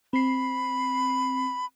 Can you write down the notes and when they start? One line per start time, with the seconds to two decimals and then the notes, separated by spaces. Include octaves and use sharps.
0.13 C4 B5 C7